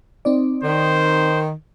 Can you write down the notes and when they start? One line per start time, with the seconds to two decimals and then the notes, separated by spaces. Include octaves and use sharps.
0.25 C4 D#4 D5
0.64 D#3 C5